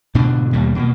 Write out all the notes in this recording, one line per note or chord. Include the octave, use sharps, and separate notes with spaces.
G#2 B2 D3 D4
D#2 B2 G3 A#3
B2 A3 A#3